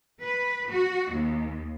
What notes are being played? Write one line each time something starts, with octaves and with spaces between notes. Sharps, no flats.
B4
F#4
D#2